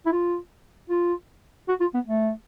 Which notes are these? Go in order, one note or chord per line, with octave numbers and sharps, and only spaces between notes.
E4
F4
F4
F#4
F4
B3
A3